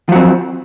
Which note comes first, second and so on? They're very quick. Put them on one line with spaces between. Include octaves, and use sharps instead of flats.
F3 F#3 C4